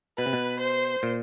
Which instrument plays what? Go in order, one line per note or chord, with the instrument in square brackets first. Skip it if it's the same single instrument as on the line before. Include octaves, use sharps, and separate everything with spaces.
[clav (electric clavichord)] B2 [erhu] B4
[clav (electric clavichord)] C3
B2
[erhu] C5
[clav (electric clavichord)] A#2